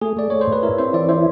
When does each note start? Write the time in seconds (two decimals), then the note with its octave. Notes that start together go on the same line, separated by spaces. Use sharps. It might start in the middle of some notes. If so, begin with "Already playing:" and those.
0.01 A3 G#4
0.17 A3 D5
0.30 A3 C#5
0.41 C5
0.47 A2
0.52 B4
0.63 E4 A#4
0.78 C4 C5
0.93 E3 D5
1.09 E4 C5